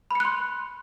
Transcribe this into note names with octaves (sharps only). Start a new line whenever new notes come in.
B5 C6 F#6 C#7